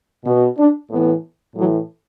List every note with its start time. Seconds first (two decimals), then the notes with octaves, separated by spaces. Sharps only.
0.25 B2
0.58 D4
0.90 A2 E3 B3
1.56 A2 E3 F#3